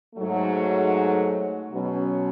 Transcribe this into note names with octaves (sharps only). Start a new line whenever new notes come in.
G#2 F#3 A3
B2 F#3 C#4